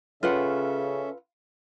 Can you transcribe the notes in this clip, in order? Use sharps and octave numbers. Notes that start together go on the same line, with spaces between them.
C#3 C#4 F4 A4 B4 E5 F#5